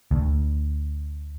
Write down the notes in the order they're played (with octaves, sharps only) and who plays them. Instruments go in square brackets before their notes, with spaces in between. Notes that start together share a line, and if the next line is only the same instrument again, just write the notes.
[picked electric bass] D2